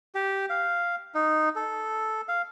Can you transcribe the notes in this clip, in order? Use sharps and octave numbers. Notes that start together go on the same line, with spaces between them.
G4
F5
D#4
A4
F5